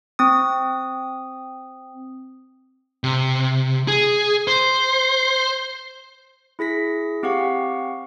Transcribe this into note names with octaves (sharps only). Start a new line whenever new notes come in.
C4 D#6
C3
G#4
C5
E4 G#4 A#6 B6
C4 G4 F5 F#5 C#6